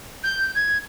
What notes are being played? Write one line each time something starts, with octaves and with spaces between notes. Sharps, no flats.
G6
G#6